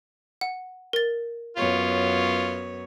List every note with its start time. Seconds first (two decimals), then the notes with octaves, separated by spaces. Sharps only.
0.41 F#5
0.93 A#4 A6
1.57 F#2 B3 F4 C#5